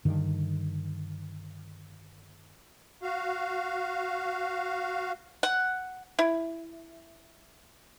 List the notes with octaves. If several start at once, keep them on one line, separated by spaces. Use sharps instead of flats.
G2 D3 D#3
F#4 F5
F#5
E4